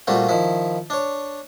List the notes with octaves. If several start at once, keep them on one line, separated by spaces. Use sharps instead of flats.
A#2 G3 A3 C4 F4 F#4
D#3 F3 E4
D4 C#5